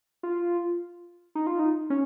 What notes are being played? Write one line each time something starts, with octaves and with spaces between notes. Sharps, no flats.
F4
D#4
F4
D#4
C#4